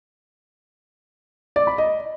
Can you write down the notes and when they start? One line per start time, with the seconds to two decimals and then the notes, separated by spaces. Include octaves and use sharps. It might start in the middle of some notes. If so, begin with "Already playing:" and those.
1.56 D5
1.67 B5
1.78 D#5